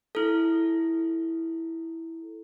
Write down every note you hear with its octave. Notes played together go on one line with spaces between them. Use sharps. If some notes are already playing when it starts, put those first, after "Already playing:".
E4 A4